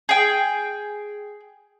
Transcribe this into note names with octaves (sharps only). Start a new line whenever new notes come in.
G#4 G5